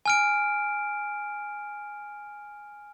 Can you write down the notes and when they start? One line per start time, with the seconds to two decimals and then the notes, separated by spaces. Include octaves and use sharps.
0.06 G#5 F6 D7